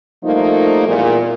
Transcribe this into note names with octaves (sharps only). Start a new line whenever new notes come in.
F3 G3 A3 A#3 D#4
E2 A#2